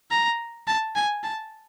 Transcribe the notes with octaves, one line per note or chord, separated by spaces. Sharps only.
A#5
A5
G#5
A5